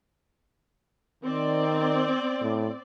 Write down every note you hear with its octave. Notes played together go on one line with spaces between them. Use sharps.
D#3 C4 D5
A2